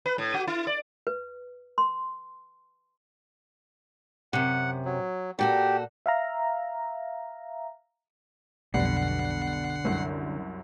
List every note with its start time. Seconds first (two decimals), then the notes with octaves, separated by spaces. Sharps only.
0.06 B4
0.18 A2
0.34 F#4
0.47 E4
0.67 D5
1.07 B4
1.78 C6
4.33 F#2 C3 F#5
4.85 F#3
5.39 A#2 F#4 G4 A4
6.06 E5 F5 A#5
8.74 B1 F2 B2 D3 G3 F#5 C7
9.85 C2 F#2